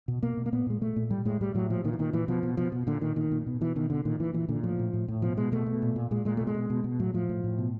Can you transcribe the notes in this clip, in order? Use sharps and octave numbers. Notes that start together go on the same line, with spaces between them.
B2
B2 A#3
B2
A#3
A#2 B3
A#2 G#3
A#2 A3
A#2
A2 G3
A2 G#3
A2 G3
A2 F#3
A#2 F3
A#2 D#3
E3
A#2 D#3
A#2 E3
B2 F3
B2
B2 F3
B2
A#2 D3
A#2 D#3
A#2 D#3
A#2
B2
B2 E3
B2 D#3
B2 D3
A#2 D#3
A#2 E3
A#2 E3
A#2 D3
A2 F3
A2
A2
A2
B2 F3
B2 G#3
B2 A3
B2
A#2
A#2
A#2 G#3
A#2 G#3
B2 A3
G#3
B2
B2
B2
A2 F#3
A2 F3
A2
A2
B2